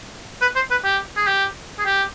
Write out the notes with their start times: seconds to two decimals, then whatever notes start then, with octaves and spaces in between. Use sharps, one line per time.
0.42 B4
0.56 C5
0.71 B4
0.84 G4
1.17 G#4
1.27 G4
1.79 G#4
1.85 G4